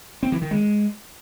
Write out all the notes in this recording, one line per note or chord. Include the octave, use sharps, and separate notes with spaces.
C4
E3
D#3
G#3